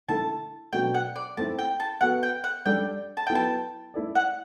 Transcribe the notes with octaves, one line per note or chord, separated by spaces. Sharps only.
D3 A3 E4 A4 A5
B2 F#3 A3 D4 G5
F#5
D5
A3 C4 E4 A5
G5
A5
B3 F#4 A4 F#5
G5
F#5
G3 D4 A4 D5 G5
A5
F#3 B3 E4 A4 G5
A5
A3 E4 A4 D5
F#5